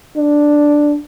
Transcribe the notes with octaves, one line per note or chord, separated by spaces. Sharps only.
D4